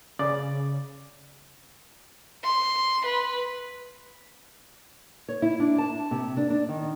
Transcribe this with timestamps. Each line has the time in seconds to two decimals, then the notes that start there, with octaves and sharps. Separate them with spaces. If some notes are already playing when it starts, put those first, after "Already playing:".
0.19 C#3 D5
2.44 C6
3.06 B4
5.28 C#5
5.42 E4
5.60 D4
5.78 A5
6.11 C3
6.37 D4
6.50 D4
6.69 D#3